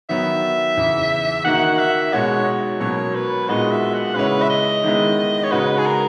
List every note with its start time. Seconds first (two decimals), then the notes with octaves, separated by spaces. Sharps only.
0.09 D#3 F#3 B3 E5
0.77 E2 C#3 E3
1.45 D#3 A#3 D#4 F#4 F#5
1.79 E5
2.13 B2 G#3 D#4 F#4 C#5
2.80 B2 F#3 A#3 C#4 C#5
3.15 B4
3.49 A#2 G#3 B3 D#4 F#4 D#5
3.71 E5
3.94 F#5
4.16 C#3 G#3 C#4 E4 B4
4.42 E5
4.50 D#5
4.84 D#3 G#3 B3 E4
5.44 C#5
5.51 C#3 G#3 D#4 F#4 B4
5.78 G#4
5.86 A#4